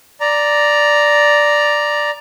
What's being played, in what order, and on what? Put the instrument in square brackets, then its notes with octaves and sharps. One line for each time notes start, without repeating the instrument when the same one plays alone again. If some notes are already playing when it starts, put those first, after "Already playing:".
[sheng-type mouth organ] D5 A#5